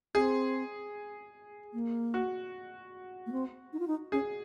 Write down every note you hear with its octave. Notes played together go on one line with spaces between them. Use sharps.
C4 G#4
A#3
F#4
A#3
C4
D#4
F4
D#4
C#4 G#4